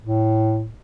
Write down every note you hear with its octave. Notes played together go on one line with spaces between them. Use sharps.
A2